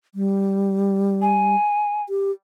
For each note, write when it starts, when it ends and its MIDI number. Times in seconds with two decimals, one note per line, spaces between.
0.15 1.55 55
1.22 2.03 80
2.09 2.31 67